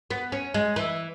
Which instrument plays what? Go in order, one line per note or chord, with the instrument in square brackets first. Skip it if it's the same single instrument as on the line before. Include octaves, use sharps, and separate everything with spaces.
[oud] B3
C#4
G#3
E3